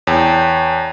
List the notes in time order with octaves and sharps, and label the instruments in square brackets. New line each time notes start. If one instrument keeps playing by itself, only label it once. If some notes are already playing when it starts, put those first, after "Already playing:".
[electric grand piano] E2 [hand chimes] C#5 G5 A5